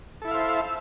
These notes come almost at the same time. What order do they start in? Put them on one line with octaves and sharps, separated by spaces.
A4 E4 E5 F5 C5